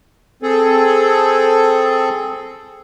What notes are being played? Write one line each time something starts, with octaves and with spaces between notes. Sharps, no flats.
C4 G#4 A4